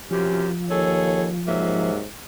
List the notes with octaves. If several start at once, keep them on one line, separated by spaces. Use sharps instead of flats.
F#2 C3 F3 C#4 G4
D#2 G#4 A4 C#5
G#2 C3 F#3 A#3 E5